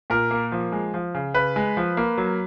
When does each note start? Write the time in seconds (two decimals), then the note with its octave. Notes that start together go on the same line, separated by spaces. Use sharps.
0.10 A#2 A#4
0.31 A#3
0.52 F3
0.72 G#3
0.94 F3
1.14 C#3
1.34 C#3 B4
1.56 G#3
1.77 F3
1.97 A#3
2.18 F#3